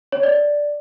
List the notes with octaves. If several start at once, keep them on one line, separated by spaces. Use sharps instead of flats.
C#5
D5